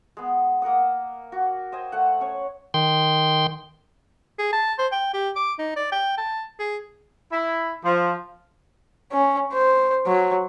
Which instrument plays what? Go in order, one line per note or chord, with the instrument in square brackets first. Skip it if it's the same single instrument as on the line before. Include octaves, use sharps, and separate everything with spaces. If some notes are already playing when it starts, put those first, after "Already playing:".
[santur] G#3 B3
A#3 A#4 F#5 D#6
F#4
C5 D#5 G5 G#5
A3 F#5
C#4 C#5 G#5
[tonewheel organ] D#3 G5 C6
[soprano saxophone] G#4
A5
C5
G5
G4
D6
D#4
D5
G5
A5
G#4
[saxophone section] E4
F3
[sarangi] C#4
C5
F#3